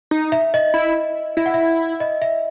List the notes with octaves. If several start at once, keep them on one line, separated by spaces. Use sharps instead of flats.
D#4
E5
D#5
E4
E4 E5
F#5
E5
D#5
E5